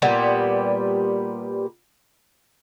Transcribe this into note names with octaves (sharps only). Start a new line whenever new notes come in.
A#2 G3 B3